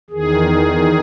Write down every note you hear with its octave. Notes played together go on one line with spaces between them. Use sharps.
E2 D#3 G#4